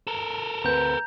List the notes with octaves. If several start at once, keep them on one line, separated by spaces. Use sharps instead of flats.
A4 A#4
D2 C4 B4 A#5 G6